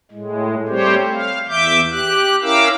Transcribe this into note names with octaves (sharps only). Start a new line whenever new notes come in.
A2 G#3
G3 A3 C4 G4 C5 C#5
F5
E2 E5 D6 G6
G4 F#6
C#4 E4 A#4 F5 D6 E6